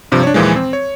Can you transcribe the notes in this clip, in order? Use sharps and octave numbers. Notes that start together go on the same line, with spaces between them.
G2 C3 F3
D4 C#5
D#2 A#2 E3 F3 G#3
C4
C#5